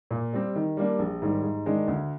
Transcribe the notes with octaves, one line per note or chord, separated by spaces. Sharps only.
A#2
G3 C4
D#3
G3 A#3 D4
A#1
G#2 D#3 G3
G#2
D#3 G#3 D4
D2